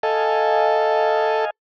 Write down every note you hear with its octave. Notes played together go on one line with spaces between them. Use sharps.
A4 D#5 F5 G#5